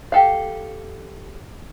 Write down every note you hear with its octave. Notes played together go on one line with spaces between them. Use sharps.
G4 A4 F5